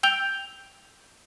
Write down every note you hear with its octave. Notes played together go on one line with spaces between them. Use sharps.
G5 E6 G6 D7 F7 G7